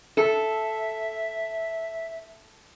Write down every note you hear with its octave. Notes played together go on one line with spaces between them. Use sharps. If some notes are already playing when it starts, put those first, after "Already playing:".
A4 E5